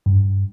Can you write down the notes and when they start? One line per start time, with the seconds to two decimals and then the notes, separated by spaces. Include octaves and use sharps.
0.06 G2